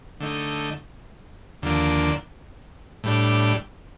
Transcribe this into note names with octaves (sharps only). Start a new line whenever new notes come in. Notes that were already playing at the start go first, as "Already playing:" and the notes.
D3 A3 D#4
D#2 D3 F3 A#3 D4
A2 G3 D4